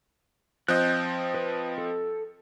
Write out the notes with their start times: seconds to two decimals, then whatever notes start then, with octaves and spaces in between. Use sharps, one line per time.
0.68 F3 C4 D#5 F#6 G6
1.34 B4
1.78 A4